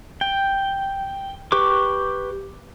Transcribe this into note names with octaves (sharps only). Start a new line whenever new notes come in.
G5
G4 B4 C#6 D6